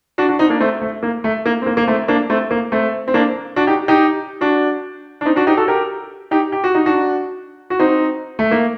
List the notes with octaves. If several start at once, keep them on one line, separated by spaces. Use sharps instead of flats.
D4 F#4
D4 F#4
C4 D#4
A#3 D4
A3 C4
A3
A#3
A3
A#3
C4
A#3
A#3
A3 C4
A#3 D4
A3 C4
A#3
A3 C4
C4
A#3 D4
D4 F#4
D#4 G4
D#4 G4
D4 F#4
D4
C4 D#4
D4 F#4
D#4 G4
F#4 A4
G4 A#4
D#4 G4
G4
F#4
D#4
D4 F#4
F#4
C4 D#4
A3
A#3